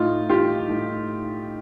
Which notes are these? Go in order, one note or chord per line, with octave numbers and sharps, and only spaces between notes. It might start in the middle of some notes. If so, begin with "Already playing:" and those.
Already playing: A2 D#4 F4
E3 F4 G4
A2